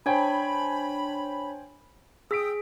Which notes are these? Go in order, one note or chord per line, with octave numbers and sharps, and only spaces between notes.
D4 C5 C#5 G5 G#5 B5
G#4 G5 D#6 E6 B6 D7